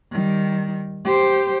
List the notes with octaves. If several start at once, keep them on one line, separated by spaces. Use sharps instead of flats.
D#3 G3
G4 C5